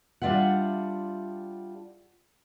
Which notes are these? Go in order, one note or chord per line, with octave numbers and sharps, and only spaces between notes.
G3 D4 F4 E5 F#5